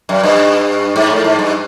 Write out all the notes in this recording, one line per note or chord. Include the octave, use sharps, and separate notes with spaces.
F#2
G2
G#2
A2
G#2
G2